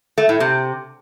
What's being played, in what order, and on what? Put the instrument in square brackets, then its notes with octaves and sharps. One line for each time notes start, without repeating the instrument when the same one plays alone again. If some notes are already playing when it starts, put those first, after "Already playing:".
[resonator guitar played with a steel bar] A3
A2
C3